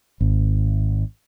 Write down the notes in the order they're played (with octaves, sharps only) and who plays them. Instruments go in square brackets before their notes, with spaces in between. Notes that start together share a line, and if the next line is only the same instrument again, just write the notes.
[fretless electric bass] G#1